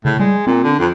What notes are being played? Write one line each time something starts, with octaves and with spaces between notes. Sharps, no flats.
A2 C#3
G3 G#3
A#2 C4
D3
F2